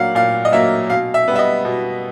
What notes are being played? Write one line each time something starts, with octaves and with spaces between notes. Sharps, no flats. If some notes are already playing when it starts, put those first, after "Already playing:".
Already playing: A#2 F#3 A#3 F5 F#5
A#2 F5
D#5
F#3 A#3 E5
B2 F5
E5
G3 B3
E5
D#5
B2